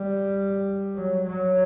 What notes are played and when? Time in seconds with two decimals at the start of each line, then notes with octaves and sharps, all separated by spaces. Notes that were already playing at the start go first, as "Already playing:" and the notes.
Already playing: G3
0.96 F#3
1.25 F#3